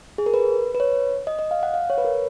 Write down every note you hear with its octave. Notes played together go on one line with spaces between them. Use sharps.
G#4
A#4
B4
B4
C#5
D#5
D#5
F5
F#5
F5
C#5
B4
A#4